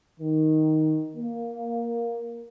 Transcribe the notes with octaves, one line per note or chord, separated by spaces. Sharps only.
D#3
A#3